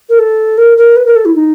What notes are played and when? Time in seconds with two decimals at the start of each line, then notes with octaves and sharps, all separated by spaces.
0.09 A#4
0.19 A4
0.58 A#4
0.78 A#4
0.96 B4
1.06 A#4
1.16 A4
1.26 E4
1.35 D#4